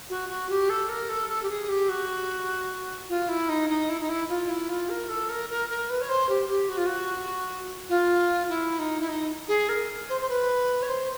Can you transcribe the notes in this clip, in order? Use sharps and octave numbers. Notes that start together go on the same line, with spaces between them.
F#4
F#4
G4
A4
A#4
A4
A4
G4
G#4
G4
F#4
F4
E4
D#4
D#4
E4
D#4
E4
F4
E4
F4
A#4
A4
A#4
A#4
A#4
B4
C#5
C5
G4
G4
F#4
F4
F#4
F4
E4
D#4
E4
D#4
G#4
A#4
C5
C5
B4
C#5
C5